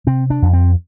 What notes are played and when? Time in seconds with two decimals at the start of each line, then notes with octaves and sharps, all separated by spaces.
0.07 C3 C4
0.30 D4
0.42 F2
0.53 C4